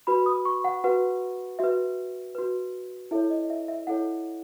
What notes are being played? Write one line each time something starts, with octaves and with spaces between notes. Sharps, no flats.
F#4 B4 B5
D#6
C#6
F#5
F#4 B4 F#5
F#4 B4 E5
F#4 B4
E4 A4 C#5 E5
D#5
E5
E5
E4 A4 C#5 F#5